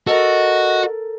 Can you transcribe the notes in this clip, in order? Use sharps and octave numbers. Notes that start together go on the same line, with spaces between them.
F#4 A4 A#4 D#5